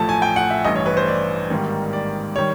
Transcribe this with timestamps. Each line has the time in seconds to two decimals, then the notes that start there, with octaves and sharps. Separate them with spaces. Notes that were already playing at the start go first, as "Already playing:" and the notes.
Already playing: A1 A2 F3 A3 A5
0.09 G#5
0.22 G5
0.36 F#5
0.50 E5
0.64 A1 G2 E3 D#5
0.76 C#5
0.86 B4
0.97 C5
1.08 D5
1.50 G#1 G#2 D#3 G3 A#3
1.93 D5
2.36 D#3 G3 C#5